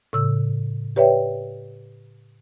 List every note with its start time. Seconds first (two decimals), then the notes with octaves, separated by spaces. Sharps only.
0.13 A2 C#3 E6
0.96 G4 B4 C#5 D5 E5 G5